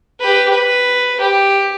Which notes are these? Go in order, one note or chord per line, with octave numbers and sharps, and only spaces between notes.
G4 B4
B4
G4